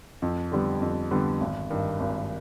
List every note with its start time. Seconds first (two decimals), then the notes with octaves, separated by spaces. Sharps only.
0.22 F2
0.52 D3 G3 B3
0.81 F2
1.11 D3 G3 B3
1.40 G#1
1.70 G2 D#3
2.00 G#1